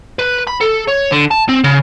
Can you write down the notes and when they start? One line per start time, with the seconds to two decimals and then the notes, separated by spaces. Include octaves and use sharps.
0.19 B4
0.47 B5
0.61 A4
0.88 C#5
1.12 D3
1.31 A5
1.49 C4
1.64 C#3